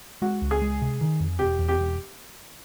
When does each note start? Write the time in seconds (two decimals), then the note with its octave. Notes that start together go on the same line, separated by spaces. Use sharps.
0.22 G#3 F#4
0.42 C#2
0.51 G#4
0.62 G#3
0.81 C3
1.01 D#3
1.20 F2
1.39 E1 G4
1.59 E2
1.68 G4
1.79 E1